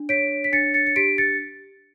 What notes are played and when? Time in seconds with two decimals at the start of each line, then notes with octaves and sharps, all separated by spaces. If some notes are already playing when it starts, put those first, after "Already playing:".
Already playing: D4
0.09 C#5 B6 D7
0.44 B6
0.52 D4 A6 C#7
0.74 A6 C#7
0.87 C#7
0.96 G4 B6 D7
1.18 A6 C#7